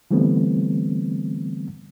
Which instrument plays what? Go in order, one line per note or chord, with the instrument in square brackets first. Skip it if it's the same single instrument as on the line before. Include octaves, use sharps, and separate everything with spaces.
[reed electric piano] D3 E3 G3 A3 B3 C4